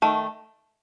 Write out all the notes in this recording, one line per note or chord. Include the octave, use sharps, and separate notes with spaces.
D#3 A3 A5